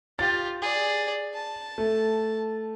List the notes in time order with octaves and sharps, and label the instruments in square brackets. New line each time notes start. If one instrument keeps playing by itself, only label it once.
[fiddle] F4 G4 [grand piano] A6
[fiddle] G#4 D5
A5
[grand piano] A3